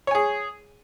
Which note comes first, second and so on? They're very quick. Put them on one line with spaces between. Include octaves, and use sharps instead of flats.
C#5 G#5 G#4